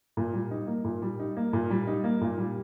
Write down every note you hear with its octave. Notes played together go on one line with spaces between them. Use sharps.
A#2
G3
D#4
A#3
A#2
G3
D#4
A#3
A#2
G3
D#4
A#3
A#2
G3